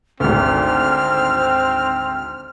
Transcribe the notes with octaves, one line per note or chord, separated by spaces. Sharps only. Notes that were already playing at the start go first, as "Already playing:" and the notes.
G#1 D2 C4 F6